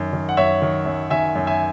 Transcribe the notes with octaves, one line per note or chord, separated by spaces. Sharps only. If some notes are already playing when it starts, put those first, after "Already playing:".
Already playing: F#2 D#3
D#3
F#5
F#2 C#5 E5
D#3
F#2
D#3 E5 G#5
F#2
E5 G#5